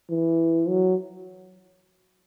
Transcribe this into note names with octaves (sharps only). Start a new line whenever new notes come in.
E3
F#3